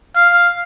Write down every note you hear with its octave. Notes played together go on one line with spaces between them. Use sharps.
F5